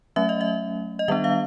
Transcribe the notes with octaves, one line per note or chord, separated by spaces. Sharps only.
F#3 A3 C#4 E5
D#5
E5
D#5
D#3 G3 B3 D4 E5
F5